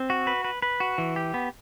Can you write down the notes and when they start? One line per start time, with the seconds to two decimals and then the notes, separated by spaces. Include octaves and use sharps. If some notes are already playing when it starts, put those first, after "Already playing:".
Already playing: C4
0.10 F#4
0.27 B4
0.44 B4
0.62 B4
0.80 F#4
0.98 E3
1.16 G4
1.34 B3